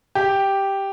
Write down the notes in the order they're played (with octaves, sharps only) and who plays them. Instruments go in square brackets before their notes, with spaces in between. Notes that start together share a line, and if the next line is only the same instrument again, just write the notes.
[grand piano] G4